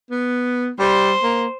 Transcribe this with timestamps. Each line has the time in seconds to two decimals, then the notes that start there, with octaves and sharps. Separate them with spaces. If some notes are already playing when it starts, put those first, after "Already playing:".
0.11 B3
0.79 G3 C5
1.23 A#3